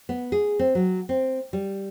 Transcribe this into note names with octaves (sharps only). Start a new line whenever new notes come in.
B3
G#4
C4
F#3
C4
G3